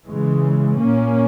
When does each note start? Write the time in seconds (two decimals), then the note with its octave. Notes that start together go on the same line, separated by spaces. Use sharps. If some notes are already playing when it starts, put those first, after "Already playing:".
0.08 C#3 E3 G#3
0.80 A#2 A#3 C#4